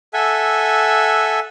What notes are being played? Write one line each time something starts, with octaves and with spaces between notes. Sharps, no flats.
A4 E5 F#5 G#5